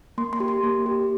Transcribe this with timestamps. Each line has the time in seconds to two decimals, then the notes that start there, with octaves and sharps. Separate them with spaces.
0.18 A#3 C6
0.33 C6
0.40 G4
0.48 C6
0.63 A#3
0.86 G4